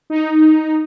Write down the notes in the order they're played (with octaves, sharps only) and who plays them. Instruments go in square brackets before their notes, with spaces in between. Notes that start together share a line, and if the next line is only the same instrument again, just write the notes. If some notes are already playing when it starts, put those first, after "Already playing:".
[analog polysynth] D#4